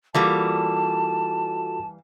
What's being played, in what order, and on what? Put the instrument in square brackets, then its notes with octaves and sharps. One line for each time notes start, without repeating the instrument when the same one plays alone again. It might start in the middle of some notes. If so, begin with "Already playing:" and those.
[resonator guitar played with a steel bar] E3 G3 A#3 [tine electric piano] F4 F#4 A4 [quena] A5